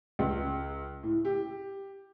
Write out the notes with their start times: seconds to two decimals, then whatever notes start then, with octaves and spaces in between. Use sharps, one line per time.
0.19 C#2
1.03 A2
1.25 G4